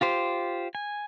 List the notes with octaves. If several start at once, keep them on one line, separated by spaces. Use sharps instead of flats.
F4 G4 C5
G#5